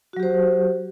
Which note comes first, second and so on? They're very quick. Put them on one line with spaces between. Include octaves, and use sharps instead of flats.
F#4 F#3 G4 C5